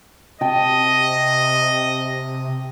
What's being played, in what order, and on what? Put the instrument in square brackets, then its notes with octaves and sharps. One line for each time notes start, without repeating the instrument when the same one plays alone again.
[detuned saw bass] C3 [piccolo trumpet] D#5 [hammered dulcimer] G5 A5